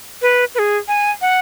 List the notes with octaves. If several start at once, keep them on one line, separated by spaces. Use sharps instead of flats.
B4
B4
G#4
G#5
F#5